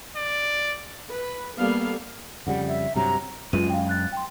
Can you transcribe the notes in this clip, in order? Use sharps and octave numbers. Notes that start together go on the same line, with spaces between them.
D5
B4
G3 A#3 B3 A4 F5
F2 C#3 G3 F#5
E5
G2 C3 F#3 A#5
F#2 G#3 F4 B4 D#7
F5 G5
F#6 A6
G5 C6